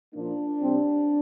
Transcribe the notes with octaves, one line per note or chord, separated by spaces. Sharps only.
A#2 F3 A#3 D4
C3 G3 C4